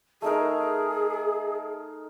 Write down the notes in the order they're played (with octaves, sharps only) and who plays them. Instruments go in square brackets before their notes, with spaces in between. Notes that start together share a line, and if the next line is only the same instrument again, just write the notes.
[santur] A3 D#4 A#4 [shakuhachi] G#4